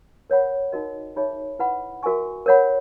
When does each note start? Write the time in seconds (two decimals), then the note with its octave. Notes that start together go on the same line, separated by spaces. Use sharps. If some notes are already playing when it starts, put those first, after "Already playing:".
0.30 A#4 C#5 F#5 B5
0.72 D#4 F#4 A#4 D#5
1.16 D#4 G#4 C#5 E5 B5
1.59 E4 B4 F#5 B5
2.03 F#4 A#4 E5 G#5 C#6
2.46 A#4 C#5 F#5 B5